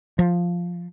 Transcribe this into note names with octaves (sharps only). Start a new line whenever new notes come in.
F3